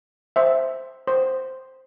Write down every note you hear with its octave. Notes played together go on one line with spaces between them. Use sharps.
C5 E5
C5